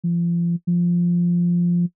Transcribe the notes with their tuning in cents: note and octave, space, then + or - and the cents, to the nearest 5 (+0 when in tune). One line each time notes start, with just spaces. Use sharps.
F3 -35
F3 -5